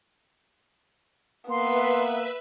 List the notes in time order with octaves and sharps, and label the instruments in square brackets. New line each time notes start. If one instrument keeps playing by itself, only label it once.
[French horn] A#3 [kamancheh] B3 [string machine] B4 E5 [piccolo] C6